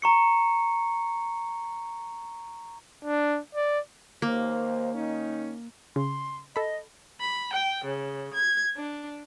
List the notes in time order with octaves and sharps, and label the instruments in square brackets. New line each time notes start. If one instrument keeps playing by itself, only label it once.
[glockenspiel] A#5 C#6 C#7
[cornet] D4
D5
[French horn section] D#2 C5 [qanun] A#3
[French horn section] D#3 C#4 D#4
[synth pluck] C#3 [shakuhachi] C6
[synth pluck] A4 B5 [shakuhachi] D#5
[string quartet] B5
G5
C#3
G#6
D4